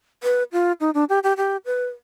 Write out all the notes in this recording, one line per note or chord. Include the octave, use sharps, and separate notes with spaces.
B4
F4
D#4
D4
G4
G4
G4
B4